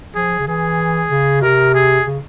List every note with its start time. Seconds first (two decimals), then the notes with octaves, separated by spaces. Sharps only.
0.15 F3 G#4
0.39 C#3
0.48 E3 G#4
1.11 C#3
1.42 C3 A#4
1.74 G#4
2.06 C#3